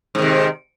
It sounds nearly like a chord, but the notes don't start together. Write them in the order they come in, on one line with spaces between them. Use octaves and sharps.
G#2 D#3 C3